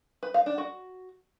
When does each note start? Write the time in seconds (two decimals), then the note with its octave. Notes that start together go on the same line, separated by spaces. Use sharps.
0.23 B4
0.34 F5
0.46 D4
0.58 F#4